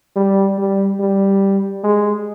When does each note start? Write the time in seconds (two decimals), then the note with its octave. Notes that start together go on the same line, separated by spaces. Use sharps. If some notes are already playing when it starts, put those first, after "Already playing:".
0.16 G3
0.58 G3
1.00 G3
1.84 G#3